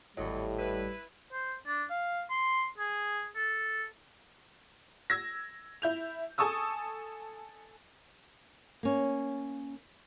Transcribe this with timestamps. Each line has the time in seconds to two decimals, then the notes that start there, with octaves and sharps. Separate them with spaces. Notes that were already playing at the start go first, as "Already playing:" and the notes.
0.17 G#1 E2 A2 F#3 G3 D#5
0.59 E4 B4
1.33 C5
1.66 D4
1.90 F5
2.30 C6
2.78 G#4
3.36 A4
5.10 E6 G#6 A#6
5.82 E4 G6 F7
6.38 A4 G#5 A5 C#6 D#6 E6
8.83 A#3 C#4